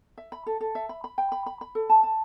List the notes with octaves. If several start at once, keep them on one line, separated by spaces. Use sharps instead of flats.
E5
B5
A4
A4
E5
B5
B5
G5
B5
B5
B5
A4
A5
A5